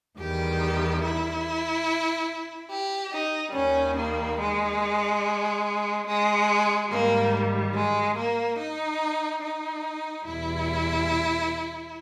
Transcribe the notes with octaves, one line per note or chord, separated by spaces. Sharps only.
E2 D#3 G3 G4
E4
G4
D#4
D#2 D#3 G3 C#4
A#3
G#3
G#3
G#2 D#3 G3 A#3
G#3
A#3
D#4
D#4
E2 B2 G3 E4